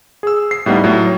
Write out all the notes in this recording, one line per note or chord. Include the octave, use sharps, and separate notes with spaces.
G#4 E6
C7
A2 G3 B3 D#4
A2 F#3